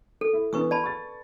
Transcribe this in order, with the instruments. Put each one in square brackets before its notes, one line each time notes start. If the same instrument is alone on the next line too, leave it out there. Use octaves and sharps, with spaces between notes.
[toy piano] A4
[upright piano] E4
[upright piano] E3 B3 D4 [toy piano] B4 C#6 D#6
[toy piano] D5 A5 B5
[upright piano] C#6 A6